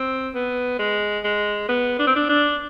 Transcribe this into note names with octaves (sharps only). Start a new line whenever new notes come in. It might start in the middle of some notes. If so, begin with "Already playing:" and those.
Already playing: C4
B3
G#3
G#3
B3
D4
C4
D4
D4